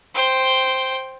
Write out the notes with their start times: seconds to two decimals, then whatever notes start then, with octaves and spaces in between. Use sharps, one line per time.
0.14 C5 G5